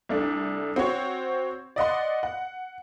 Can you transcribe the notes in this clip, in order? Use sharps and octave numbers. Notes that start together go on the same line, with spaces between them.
C2 A3 D4
C4 F#4 C5 C#5
D5 D#5 F#5 C6
F#5